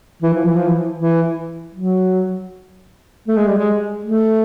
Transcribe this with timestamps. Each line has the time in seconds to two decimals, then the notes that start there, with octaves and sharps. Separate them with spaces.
0.22 E3
0.34 F3
0.45 E3
0.56 F3
0.68 E3
0.98 E3
1.75 F#3
3.28 A3
3.37 G#3
3.47 G3
3.57 G#3
4.04 A3